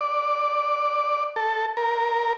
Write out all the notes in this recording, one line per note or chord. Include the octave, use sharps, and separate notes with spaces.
D5
A4
A#4